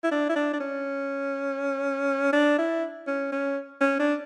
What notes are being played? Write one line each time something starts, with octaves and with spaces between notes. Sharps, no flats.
E4
D4
E4
D4
D4
C#4
D4
E4
C#4
C#4
C#4
D4